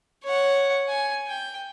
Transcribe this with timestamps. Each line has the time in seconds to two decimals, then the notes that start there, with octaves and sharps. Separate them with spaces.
0.24 C#5 F#5
0.89 G#5
1.28 G5